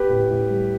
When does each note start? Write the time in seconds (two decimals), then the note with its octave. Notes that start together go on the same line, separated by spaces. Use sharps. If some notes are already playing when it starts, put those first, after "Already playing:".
Already playing: B3 G4 B4
0.09 A2
0.30 A2
0.49 G3